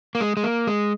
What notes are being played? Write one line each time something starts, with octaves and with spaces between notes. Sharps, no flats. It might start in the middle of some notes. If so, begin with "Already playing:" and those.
A#3
G#3
G#3
A#3
G#3